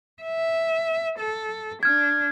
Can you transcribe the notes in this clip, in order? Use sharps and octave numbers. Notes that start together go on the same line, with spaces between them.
E5
A4
D4 F6 G#6